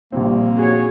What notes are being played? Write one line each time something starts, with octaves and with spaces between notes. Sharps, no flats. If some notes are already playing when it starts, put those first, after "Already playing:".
A#1 G3 A#3 C4
F#4 G#4 C#5